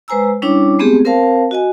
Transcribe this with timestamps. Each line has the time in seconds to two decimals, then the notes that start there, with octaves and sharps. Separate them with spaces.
0.08 G#3 B4 C5 G#5 A#5 E6
0.42 G3 C#4 D4 E4 C#5 D6
0.79 G#3 A3 B3 C4 G4 G#4
1.05 C4 A#4 C5 F5 A5
1.51 F#4 D#5 G#5